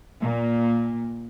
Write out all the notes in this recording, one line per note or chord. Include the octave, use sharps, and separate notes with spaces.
A#2